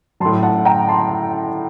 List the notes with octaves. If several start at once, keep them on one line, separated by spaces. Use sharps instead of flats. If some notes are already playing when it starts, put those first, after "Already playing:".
A2 F#3 A5 C6
F#5 A5
G5 A#5
A5 C6